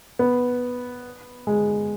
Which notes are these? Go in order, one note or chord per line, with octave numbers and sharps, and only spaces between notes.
B3
G#3